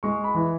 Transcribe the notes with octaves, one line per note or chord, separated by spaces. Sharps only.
G#3 C#6
B5
E3